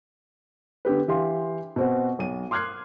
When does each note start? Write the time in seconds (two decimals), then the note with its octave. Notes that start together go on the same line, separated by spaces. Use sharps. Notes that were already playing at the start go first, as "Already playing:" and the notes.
0.85 D3 B3 G4 B4
1.08 E3 G4 F5 C6
1.76 B2 C4 F#4
2.19 B1 D#7
2.51 C6 D6 F6 F#6 G#6 C7